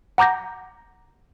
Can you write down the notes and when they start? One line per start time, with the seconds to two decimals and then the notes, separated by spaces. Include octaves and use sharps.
0.18 F#5 A#5 D6 G6 A#6